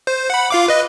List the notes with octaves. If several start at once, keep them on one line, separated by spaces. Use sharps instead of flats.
C5
F#5 B5
F4 F5 D6
B4 D#5